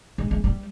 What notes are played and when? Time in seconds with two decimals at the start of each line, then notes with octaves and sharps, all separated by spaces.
0.18 G#3
0.31 G#3
0.44 G3